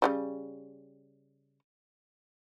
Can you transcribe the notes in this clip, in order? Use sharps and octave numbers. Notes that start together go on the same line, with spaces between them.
C#3 F#3 G3